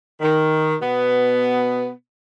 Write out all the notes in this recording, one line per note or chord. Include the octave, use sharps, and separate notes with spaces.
D#3
B2 B3